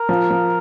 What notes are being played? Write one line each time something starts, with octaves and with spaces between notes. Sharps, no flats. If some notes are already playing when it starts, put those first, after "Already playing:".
Already playing: A#4
F3
F3